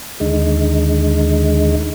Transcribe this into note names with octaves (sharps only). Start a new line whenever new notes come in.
D#2 D3 G#3 D#4